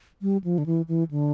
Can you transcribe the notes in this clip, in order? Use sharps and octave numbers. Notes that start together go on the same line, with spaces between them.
G3
F3
D3
E3
E3
D3